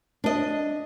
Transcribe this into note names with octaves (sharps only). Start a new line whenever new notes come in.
D4 D#5